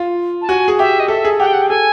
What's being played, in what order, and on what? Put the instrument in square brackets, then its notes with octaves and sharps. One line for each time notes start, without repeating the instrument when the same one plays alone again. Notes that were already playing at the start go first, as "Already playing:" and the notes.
Already playing: [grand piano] F4
[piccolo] A5
[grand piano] F#4 [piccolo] G#5
[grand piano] G#4
[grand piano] G4 [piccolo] E5
[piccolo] D#5
[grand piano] A4 [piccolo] E5
[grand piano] G#4
[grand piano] G4 [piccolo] F#5
[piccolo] G5
F#5
G5
[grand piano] A4 [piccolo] G#5